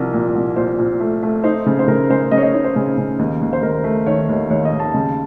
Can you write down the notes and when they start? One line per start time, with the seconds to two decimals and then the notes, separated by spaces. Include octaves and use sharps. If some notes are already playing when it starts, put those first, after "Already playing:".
Already playing: C2 F3 A#4
0.13 A#2
0.35 C2
0.56 A#2 C5
0.79 A#2
1.00 A3
1.23 A3
1.44 D#4 C5
1.66 C#3
1.79 C5
1.88 C#3 A#4
2.10 C#3 C5
2.31 C#3 D#5
2.37 C#5
2.43 D#5
2.54 D#4 C#5
2.64 C5
2.76 C#3
2.98 C#3
3.19 D#2
3.41 D#2
3.53 C5
3.62 D#2 A#4
3.84 A3
4.06 D#3 C#5
4.29 D#2
4.50 D#2 C#5
4.65 D#5
4.73 D#2
4.80 A5
4.94 C#3